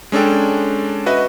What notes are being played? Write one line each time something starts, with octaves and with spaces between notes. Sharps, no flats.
G#3 C#4 D4 A4 G5
F#4 B4 D#5 E5